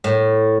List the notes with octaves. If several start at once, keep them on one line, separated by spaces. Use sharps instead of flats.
A2